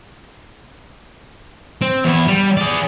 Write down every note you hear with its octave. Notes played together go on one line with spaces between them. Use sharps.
C4
E2 E4
G3
G#4 D5